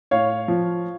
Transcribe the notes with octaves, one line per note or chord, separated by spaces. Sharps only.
A2 C#5 F5
F3